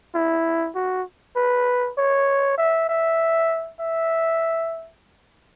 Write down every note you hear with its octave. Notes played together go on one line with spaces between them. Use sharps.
E4
F#4
B4
C#5
E5
E5
E5